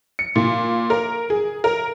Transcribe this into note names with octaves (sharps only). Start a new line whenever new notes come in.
C#7
A#2
A#4
G#4
A#4